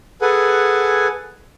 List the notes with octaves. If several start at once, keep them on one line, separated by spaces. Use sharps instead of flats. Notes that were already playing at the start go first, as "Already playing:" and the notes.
G#4 A4 B4 F#5 G#5